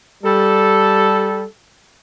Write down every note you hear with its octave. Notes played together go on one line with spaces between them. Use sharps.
G3 A4